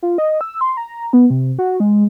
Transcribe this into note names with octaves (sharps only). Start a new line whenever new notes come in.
F4
D#5
E6
C6
A#5
B3
C3
F#4
G#3